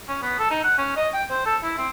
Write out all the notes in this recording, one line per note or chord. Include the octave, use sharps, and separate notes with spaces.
C#4
B3
A4
D#4
F#5
C#4
D#5
G5
C5
A4
E4
C4